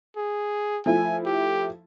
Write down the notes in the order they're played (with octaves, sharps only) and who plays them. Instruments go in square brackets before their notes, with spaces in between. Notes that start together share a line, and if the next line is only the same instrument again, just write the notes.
[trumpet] G#4
[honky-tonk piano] F3 A3 E4 [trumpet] G#5
[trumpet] G4